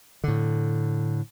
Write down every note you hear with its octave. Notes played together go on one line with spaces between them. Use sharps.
A2 D3